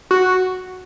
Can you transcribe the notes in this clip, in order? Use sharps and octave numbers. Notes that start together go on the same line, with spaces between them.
F#4